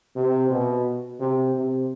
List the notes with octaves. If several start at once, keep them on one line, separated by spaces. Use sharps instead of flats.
C3
B2
C3
C3